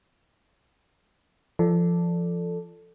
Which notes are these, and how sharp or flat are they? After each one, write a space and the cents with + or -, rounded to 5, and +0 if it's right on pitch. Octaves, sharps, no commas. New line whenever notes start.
F3 -25 A4 +0 D5 +0